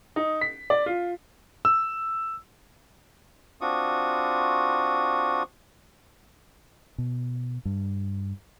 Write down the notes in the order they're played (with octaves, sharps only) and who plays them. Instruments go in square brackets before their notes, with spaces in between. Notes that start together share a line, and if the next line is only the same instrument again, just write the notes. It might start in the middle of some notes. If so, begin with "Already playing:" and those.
[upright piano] D#4
B6
D5
F4
[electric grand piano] E6
[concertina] C4 D4 F4 F#4 C#6 D#6
[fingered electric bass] B2
G2